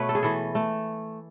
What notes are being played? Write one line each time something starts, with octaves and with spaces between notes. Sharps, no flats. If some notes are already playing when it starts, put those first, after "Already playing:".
Already playing: B2 A3 B4 C#5
A4
G#4
E3 A4
A3